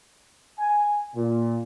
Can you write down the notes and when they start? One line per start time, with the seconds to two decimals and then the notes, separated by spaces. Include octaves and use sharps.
0.59 G#5
1.15 A#2